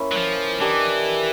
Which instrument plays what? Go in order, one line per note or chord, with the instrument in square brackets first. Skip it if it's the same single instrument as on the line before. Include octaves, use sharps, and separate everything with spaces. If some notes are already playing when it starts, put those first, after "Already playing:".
Already playing: [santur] A#3 C#4 E4
[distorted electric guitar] F#3
F3
[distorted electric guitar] E3 [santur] D4 G4 A#4 D#5